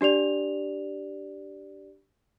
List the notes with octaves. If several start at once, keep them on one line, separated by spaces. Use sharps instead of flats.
D4 G4 D5 F7